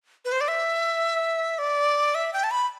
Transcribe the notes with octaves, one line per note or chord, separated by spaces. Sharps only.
B4
C5
D5
E5
D5
E5
G5
A5
B5